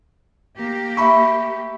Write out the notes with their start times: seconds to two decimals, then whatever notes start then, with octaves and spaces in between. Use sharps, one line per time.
0.58 A#3 G4
0.97 E5 B5 C#6